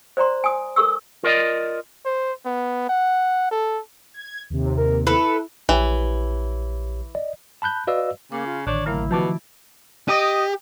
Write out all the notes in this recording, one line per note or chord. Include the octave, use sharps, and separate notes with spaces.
C5 D5 A#5 C6
G#5 D#6
A4 A#4 C#6 E6
F4 A#4 D5 D#5
C5
B3
F#5
A4
G#6
D#2 C3
A#4
E4 A4 B4
A#1 E3 G4 C#5
D5 D#5
A5 B5 F#6 G6
F#4 B4 D5 D#5 F5 E6
C#3 A#3 D6
F4
A1 D3 D#3 D4 C#5
C#3 F#3 A3 A#3 E4
B2 D#3 F3 F#4 A5 D6
G4 D#5